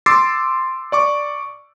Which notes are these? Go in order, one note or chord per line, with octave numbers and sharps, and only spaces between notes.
C6 D6 E6 A6 C7
D5 C#6 D6